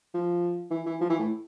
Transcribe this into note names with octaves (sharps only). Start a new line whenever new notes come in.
F3
E3
E3
F3
E3
A2